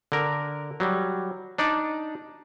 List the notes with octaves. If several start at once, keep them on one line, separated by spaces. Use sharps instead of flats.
D3 A#4
F#3 G3
D4 D#4 D5